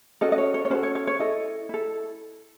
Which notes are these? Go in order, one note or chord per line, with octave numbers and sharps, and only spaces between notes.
C#4 F#4 A4 D#5
D#5
C#5
C#5
C#5
C#4 F#4 A4 C5
C#5
C#5
C#5
E4 A4 D#5
E4 A4